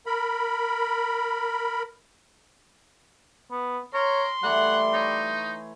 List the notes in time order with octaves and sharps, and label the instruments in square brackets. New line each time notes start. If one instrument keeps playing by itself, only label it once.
[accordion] A#4 B5
[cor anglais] B3
[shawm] A#4 [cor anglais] C#5 [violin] C6
[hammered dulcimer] E3 A3 [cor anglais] G3 [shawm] F#5
[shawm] D#4 [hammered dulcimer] C#5